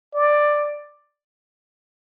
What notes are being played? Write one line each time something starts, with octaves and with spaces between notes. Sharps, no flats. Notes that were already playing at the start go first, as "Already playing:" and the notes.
D5